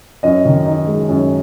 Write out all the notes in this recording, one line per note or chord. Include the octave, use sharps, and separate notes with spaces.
F#2 D#5
D#3
D#4
G#3
F#2